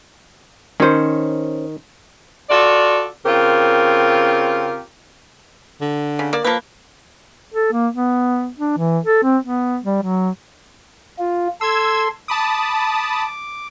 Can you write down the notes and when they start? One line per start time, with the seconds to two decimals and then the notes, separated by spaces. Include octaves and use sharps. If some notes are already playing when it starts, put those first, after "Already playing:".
0.80 D#3 C#4 C5
2.50 F4 F#4 A4 D5
3.25 C#3 C4 F4 G4 A#4
5.81 D3
6.19 C#3
6.33 A#3 D5
6.44 F3 A#3 B4
7.53 A4
7.73 A#3
7.94 B3
8.58 D4
8.77 E3
9.05 A4
9.23 C4
9.43 B3
9.84 G3
10.03 F#3
11.19 F4
11.61 A4 C6 E6 G#6 E7
12.28 A5 B5 D6 D#6